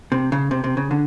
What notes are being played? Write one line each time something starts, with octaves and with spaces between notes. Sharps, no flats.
C3
C#3
C3
C3
C#3
D3